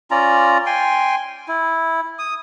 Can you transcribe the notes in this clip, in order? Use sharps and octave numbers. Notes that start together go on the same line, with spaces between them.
C#4 F4 D5 A#5
G5 G#5 C6
E4
D#6